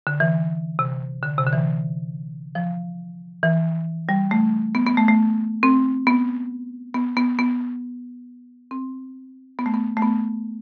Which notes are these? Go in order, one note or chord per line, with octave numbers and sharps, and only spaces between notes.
D3
E3
C3
D3
C3
D3
E3
F3
E3
G3
A3
B3
B3
A3
A3
C4
B3
B3
B3
B3
C4
B3
A3
B3
A3
B3